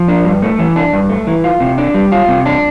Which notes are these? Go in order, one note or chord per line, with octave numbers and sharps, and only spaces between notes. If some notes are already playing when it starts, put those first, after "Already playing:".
Already playing: F3
D4
G2
A3
E3
D4
G2
A3
E3
F4
C3
D4
G3
F4
C3
D4